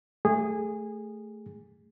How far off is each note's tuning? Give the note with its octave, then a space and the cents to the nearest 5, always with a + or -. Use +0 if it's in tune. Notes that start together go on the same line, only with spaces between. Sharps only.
A3 +0 G#4 -20